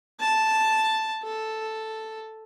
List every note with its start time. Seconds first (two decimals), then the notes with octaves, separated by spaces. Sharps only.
0.20 A5
1.23 A4